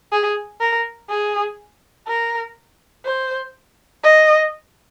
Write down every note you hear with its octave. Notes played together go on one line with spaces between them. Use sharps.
G#4
A#4
G#4
A#4
C5
D#5